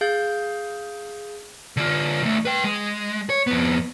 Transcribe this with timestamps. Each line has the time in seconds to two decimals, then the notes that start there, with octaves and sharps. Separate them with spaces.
0.01 G#4 F5 G6
1.77 D3 F4
2.23 D#3 A3
2.45 B4 G5
2.64 G#3
3.30 C#5
3.47 F2 B3